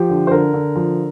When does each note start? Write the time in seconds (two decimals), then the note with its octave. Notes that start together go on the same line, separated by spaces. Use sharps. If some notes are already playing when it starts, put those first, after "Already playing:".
Already playing: F3 G4
0.09 D3
0.27 C5
0.31 D3 A#4
0.53 D3
0.76 F3